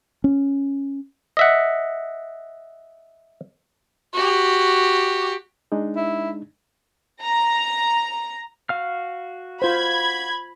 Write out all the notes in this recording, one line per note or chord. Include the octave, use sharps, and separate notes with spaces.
C#4
D#5 E5 F#5
F#4 G4
G#3 D4 D#4
E4
A#5
F#4 F5 F6
F4 C5 B5 G#6